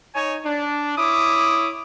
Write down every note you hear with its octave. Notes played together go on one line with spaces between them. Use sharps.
D#4 C#5 G#5
D4
E4 C#5 D6 D#6